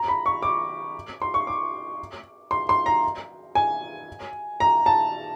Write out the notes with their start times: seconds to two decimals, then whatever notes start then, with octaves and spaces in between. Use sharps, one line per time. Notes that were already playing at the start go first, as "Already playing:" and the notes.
Already playing: A#5
0.08 B5
0.26 C#6
0.43 D6
1.22 C6
1.34 C#6
1.47 D6
2.51 C6
2.69 C6
2.86 A#5
3.55 G#5
4.60 A#5
4.86 A5